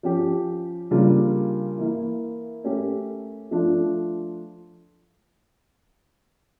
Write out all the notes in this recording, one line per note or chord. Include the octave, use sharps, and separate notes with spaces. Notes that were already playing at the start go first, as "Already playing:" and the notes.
F3 C#4 G4
C#3 G3 A#3 D4 F4
E3 A#3 E4
A3 C#4 G4 A#4
F3 A3 D4 F4